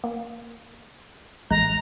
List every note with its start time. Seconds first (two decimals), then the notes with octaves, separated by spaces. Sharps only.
0.04 A#3
1.50 A1 G#3 A#5 F#6